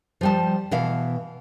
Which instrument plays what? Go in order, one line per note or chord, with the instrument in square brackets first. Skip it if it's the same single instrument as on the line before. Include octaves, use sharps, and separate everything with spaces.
[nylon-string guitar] F3 G3 A5
B2 E3 F5